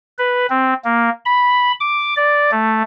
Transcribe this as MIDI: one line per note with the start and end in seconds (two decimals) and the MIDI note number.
0.19 0.46 71
0.50 0.74 60
0.84 1.10 58
1.25 1.72 83
1.80 2.14 86
2.17 2.51 74
2.52 2.82 57